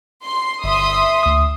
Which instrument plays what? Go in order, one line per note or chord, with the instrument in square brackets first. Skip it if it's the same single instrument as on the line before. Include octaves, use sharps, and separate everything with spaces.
[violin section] C6
[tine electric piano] G1 [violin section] E5 C6 D#6
[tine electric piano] D2 D#6